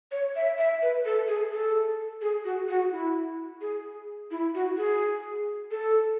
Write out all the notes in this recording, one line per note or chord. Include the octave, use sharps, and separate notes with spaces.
C#5
E5
E5
B4
A4
G#4
A4
G#4
F#4
F#4
E4
G#4
E4
F#4
G#4
A4